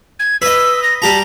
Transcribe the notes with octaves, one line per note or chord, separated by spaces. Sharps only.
G#6
B4 D#5 E6
A#6
G3 G4 A5 A#5